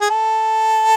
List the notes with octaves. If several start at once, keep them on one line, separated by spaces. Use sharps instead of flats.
G#4
A4